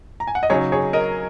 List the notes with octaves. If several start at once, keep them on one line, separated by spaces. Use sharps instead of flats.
A#5
G#5
F#5
D#5
C#3 F#3 D#4 G#4 C#5
G#4 C#5
A#4 D#5